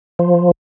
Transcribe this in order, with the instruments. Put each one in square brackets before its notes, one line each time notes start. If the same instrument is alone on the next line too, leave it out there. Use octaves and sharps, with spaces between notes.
[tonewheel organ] F3